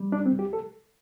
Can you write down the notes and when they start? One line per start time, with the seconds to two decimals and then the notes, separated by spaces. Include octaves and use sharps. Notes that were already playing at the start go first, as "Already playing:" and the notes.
Already playing: G3
0.12 C2 D4
0.26 C4
0.33 C2
0.39 G4
0.53 A4